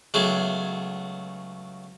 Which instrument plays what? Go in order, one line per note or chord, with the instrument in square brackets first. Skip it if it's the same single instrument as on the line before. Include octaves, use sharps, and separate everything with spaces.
[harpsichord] C#2 F#3 A3 B3 G#4